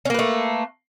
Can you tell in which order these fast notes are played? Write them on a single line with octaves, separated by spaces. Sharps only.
C#4 A#3 B4 A3